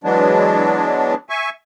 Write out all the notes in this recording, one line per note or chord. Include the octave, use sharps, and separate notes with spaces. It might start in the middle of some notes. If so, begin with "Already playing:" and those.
E3 F#3 G#3 B3 D4
E5 G#5 C#6